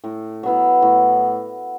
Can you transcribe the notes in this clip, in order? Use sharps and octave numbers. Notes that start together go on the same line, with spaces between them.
A2
F#3 B3 E4
A2